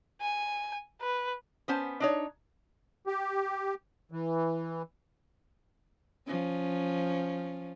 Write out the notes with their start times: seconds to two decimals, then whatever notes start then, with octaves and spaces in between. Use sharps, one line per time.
0.22 G#5
1.01 B4
1.68 B3 C#4 C5 A5
2.00 D4 D#4 C#5
3.07 G4
4.12 E3
6.27 F3 C#4